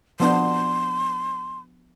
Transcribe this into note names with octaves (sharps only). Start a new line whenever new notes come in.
F3 B3 D4 C6